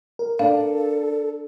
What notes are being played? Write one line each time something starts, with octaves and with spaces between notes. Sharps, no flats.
A#4
D4 A4 F5